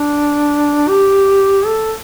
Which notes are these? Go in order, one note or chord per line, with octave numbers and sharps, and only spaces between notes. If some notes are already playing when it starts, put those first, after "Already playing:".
Already playing: D4
G4
A4